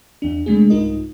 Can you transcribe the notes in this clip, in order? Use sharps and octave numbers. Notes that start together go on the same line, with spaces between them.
E2 D4
C3 G#3 A3 D4 G#4
C2 G#2 D#4 F4 A#4 D#5